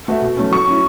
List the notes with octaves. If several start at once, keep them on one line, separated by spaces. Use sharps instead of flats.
A3 F#4 B4 E5
B2
F#3 A3 C#4
F#3 C#6
C#4 E4